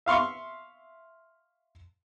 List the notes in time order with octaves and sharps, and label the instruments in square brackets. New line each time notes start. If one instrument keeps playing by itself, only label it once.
[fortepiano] E5 F5 C6 C#6